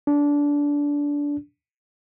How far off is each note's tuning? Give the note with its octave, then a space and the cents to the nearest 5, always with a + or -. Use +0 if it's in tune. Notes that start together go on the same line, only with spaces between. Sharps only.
D4 -20